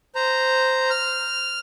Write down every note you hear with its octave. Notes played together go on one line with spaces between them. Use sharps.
C5 A#5
F6